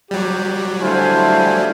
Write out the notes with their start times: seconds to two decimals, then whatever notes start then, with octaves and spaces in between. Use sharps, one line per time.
0.11 F#3 G3 G4
0.81 D3 A3 E4 C5 F5 G#5